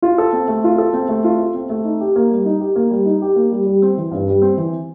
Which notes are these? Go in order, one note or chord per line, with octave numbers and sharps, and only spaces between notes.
F4
A4
C4
A3
F4
A4
C4
A3
F4
A4
C4
A3
D#4
G4
A#3
G3
D#4
G4
A#3
G3
D#4
G4
A#3
G3
G3
C4
E3
G2
G3
C4
E3